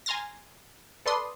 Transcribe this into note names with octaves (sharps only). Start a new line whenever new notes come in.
G#5 A#5 C6 F6 A6 A#6
A4 B4 D5 C6 D#6